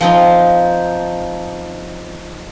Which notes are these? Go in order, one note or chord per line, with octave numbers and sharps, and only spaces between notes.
F3 C4 D#4